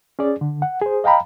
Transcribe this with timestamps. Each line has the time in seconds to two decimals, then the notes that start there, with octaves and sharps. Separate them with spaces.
0.19 C#4 G#4 D5
0.41 D3
0.62 F#5
0.82 G#4 C5
1.04 D#5 F5 G5 A#5 B5